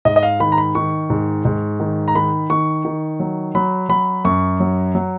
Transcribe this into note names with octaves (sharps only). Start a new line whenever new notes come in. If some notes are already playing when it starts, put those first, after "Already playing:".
G#2 D#5
D#5
F5
D#3 B5
A#5
B5
D#3 C#6
G#2
G#2
D#3
A#5
D#3 B5
D#3 C#6
D#3
F#3
F#3 B5
F#3 B5
F#2 C#6
F#3
F#3